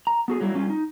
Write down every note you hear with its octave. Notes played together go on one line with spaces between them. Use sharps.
A#5
B3 F#4 G#4
F#3 G3 A#3 E4
G3 C#4 F4
D#4